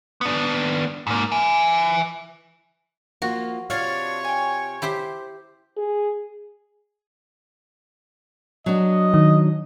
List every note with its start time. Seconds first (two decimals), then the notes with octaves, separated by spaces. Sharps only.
0.21 B3 D4
1.07 G#2 A#3
1.32 E5 G#5
3.22 F3 A#3 F4 F#4
3.70 C3 D4 F4 C#5 F5 F6
4.24 G5 G#5
4.82 E4 G4 C5
5.77 G#4
8.66 F#3 D4 D#5
9.14 D#3